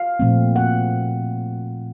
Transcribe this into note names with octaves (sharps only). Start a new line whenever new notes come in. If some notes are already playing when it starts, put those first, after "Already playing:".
Already playing: F5
A#2 F3 A3 C4
F#5